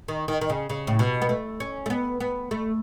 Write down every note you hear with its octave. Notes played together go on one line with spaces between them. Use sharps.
D#3
D#3
D#3
C#3
C#3
A2
B2
B3
A3
C#4
A3
B3
B3
A3